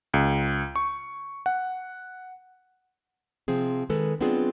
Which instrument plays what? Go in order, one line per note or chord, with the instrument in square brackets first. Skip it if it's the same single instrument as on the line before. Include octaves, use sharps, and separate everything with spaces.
[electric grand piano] C#2
C#6
F#5
[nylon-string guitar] C3 F3 C4 G#4
D#3 G#3 A4 B4
F#3 B3 C4 D4 F4 G#4